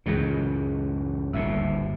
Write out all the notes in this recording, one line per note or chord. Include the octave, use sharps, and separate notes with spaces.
C#2 F#2 A2 E3 G#3 G#4
G1 D2 A2 A#3 E5 E6